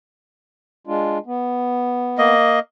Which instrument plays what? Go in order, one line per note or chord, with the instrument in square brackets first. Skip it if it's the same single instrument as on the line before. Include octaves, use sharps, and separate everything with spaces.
[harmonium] G#3 D4 F4
B3
[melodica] A#3 D#5